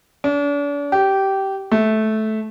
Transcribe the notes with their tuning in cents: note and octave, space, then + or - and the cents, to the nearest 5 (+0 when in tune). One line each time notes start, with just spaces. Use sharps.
D4 -40
G4 -15
A3 -15